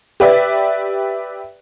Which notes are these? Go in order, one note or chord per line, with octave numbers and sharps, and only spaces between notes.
G4 B4 D5 E5